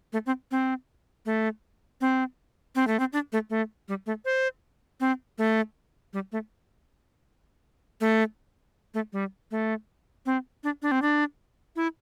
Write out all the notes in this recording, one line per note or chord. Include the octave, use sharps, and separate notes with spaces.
A3
C4
C4
A3
C4
C4
A3
C4
D4
A3
A3
G3
A3
C5
C4
A3
G3
A3
A3
A3
G3
A3
C4
D4
D4
C4
D4
E4